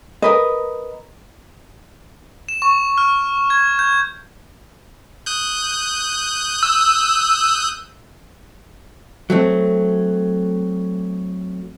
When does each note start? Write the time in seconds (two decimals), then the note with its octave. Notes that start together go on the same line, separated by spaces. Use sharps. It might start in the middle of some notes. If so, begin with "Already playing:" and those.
0.22 A#4 B4 D#5
2.49 E7
2.62 C#6
2.98 F6
3.50 G#6
3.79 G6
5.26 D#6 F#6 G6
6.63 E6
9.30 F#3 A3 C4